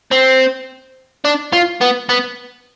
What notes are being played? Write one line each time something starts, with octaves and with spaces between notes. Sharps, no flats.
C4
D4
F4
B3
B3